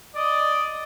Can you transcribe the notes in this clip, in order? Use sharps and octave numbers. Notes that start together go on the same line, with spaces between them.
D5 D#5